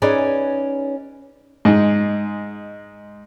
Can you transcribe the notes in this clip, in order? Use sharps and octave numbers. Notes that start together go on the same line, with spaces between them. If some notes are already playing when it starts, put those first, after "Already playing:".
C#4 D#4 G#4 B4 D5
G#2 G#3